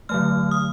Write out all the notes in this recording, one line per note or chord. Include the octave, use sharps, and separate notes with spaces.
D3 F#3 A3 F6
D#6